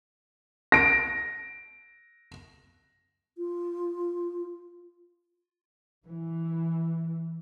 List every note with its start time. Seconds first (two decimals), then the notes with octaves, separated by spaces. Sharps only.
0.72 A#6 D7
3.38 F4
6.06 E3